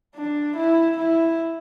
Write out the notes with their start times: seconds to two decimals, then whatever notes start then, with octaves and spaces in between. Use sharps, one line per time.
0.15 D4
0.56 E4
0.97 E4